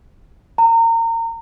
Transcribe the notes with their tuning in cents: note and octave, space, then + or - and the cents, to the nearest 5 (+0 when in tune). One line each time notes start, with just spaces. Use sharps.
A#5 -30